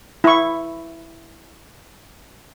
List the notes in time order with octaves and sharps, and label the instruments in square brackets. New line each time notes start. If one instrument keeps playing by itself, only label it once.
[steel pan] E4 C#6